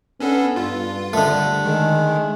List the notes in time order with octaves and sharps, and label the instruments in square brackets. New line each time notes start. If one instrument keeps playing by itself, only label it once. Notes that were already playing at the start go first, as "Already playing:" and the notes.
[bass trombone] B3 [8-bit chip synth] C#4 D4 A4
[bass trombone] G2 [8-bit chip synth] F4
[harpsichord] D3 A3 [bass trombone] G3
[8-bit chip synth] D#3 [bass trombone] G#3